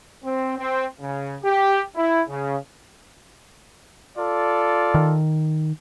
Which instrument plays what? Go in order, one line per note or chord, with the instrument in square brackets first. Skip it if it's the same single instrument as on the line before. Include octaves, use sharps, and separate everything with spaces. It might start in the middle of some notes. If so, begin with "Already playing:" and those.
[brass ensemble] C4
C4
C#3
G4
E4
C#3
[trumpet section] F4 A4 D5
[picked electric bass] D#3